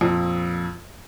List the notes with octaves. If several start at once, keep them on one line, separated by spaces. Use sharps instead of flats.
F2 A#2